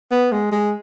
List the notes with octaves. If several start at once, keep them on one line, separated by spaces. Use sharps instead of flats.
B3
G#3
G#3